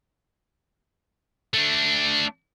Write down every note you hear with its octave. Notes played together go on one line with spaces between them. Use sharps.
A3 D4